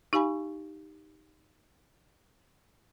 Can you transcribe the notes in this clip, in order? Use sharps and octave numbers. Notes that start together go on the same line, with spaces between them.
D#4 G4 F5 G#5 B5